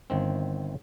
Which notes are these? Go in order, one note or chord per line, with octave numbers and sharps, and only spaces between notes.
G1 D#3 C4